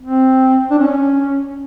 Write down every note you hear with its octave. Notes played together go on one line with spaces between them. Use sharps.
C4
D4
C#4